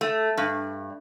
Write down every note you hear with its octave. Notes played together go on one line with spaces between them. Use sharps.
A3
G2